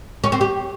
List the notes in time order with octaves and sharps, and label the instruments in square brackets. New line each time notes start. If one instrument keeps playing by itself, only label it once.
[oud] C#4
C4
G4